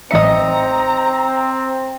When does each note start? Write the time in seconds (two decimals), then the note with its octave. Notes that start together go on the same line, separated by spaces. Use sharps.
0.11 A1 C4 D#4 D#5 E5 A#5 C#7